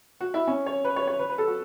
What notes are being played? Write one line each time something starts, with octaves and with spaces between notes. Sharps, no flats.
F#4
E4
C#4
C#5
B4
C#5
C#5
B4
B4
A4
F#4